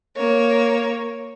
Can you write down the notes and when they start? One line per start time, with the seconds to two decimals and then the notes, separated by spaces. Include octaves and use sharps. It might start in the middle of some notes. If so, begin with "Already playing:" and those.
0.17 A#3 C#5